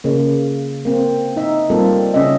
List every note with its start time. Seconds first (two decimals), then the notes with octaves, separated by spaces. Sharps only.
0.04 C#3 A#3
0.85 A#3 C4
1.36 D#4 E5
1.70 G3 A#3 C4 F4 A4
2.14 C#3 C#4 D#5 E5